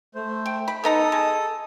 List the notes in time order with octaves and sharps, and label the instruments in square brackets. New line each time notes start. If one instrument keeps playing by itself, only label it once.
[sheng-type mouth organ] A3 C5
[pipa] G5
B5
[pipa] B3 D#4 A#5 [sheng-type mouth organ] A4 D#6
[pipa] G#3